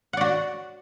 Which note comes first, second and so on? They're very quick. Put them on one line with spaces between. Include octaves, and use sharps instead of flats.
F#5 D5 F#4